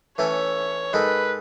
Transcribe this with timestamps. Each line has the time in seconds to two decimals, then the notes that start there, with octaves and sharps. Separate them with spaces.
0.18 E3 A3 C#4 E4 A4 C#5
0.93 G#2 D#3 G#3 D#4 A4 B4